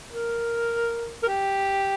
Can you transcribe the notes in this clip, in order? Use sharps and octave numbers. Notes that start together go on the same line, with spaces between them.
A#4
A#4
G4